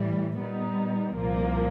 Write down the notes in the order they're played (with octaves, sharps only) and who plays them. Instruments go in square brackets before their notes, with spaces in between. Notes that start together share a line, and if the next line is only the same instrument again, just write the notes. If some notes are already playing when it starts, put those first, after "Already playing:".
Already playing: [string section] A2 E3 G3
A#2 G3 B3 D#4
C2 A#2 F3 A#3